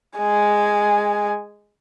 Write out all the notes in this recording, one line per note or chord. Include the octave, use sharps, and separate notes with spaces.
G#3 G#5